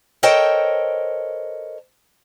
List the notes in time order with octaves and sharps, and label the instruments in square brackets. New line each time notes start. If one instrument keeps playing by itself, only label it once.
[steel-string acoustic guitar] A4 A#4 C5 C#5 D#5 G5